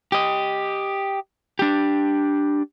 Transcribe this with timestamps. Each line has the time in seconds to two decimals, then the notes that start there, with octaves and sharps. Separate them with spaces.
0.12 G4 D#5
1.59 D4 G4